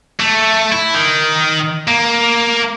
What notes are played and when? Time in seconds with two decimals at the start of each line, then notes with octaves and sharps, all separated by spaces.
0.20 A3
0.72 E4
0.95 D#3
1.88 A#3